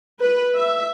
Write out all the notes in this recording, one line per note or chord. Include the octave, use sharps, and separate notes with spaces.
B4
E5